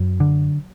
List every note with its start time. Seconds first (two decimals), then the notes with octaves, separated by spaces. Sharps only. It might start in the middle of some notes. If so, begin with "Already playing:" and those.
Already playing: F#2 F#3
0.20 D3